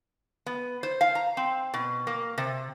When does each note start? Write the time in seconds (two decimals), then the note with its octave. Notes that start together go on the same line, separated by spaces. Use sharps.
0.46 B3
0.83 C5
1.01 F5
1.15 A#5
1.37 C4
1.74 B2
2.07 A#3
2.38 C3